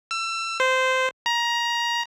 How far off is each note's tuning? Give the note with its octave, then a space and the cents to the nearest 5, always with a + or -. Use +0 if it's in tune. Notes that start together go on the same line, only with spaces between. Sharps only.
E6 +30
C5 -15
A#5 +20